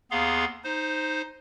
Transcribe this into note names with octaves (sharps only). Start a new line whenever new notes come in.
D#2 B3 G#4 F5 A#5 C6
D#4 C5